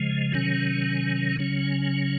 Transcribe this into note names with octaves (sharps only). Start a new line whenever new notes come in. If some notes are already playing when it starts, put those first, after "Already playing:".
Already playing: C#3 F3 G#3
C3 D#3 F#3 C#4
C#3 F#3 C#4